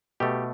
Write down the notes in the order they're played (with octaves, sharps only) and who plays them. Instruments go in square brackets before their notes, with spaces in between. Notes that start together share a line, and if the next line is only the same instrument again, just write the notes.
[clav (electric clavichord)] B2 A3 G4